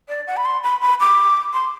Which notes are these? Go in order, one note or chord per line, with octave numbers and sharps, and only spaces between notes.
D5
F#5
B5
C6
B5
B5
D6
C6